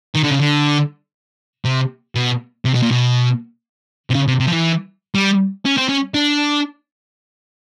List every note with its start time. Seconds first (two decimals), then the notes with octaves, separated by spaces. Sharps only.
0.15 D#3
0.23 D3
0.31 C#3
0.39 D3
1.65 C3
2.15 B2
2.65 C3
2.74 B2
2.83 A#2
2.91 B2
4.10 C3
4.15 C#3
4.28 C3
4.40 C3
4.47 F3
4.52 E3
5.15 G3
5.65 C#4
5.77 C4
5.89 C#4
6.14 D4